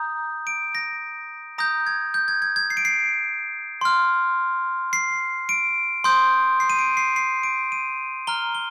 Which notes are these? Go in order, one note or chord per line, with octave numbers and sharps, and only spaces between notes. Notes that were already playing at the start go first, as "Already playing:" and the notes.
Already playing: A#5 D#6 G6
D7
A#6
A#5 D#6 G6 A#6
G#6
G6
G#6
G#6
G#6
C7
D7
C7
C6 F6
C7
D7
C6 D#6 G6
C7
D#7
D7
C7
C7
D7
D#7
A#5 F6 G7
G7